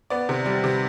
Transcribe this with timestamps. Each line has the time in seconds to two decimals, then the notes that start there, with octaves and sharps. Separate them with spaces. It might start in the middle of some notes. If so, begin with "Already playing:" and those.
0.10 B3 D5
0.29 C3
0.46 G3
0.64 C3